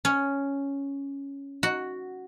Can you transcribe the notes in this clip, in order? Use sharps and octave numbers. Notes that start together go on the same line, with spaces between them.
C#4
F#4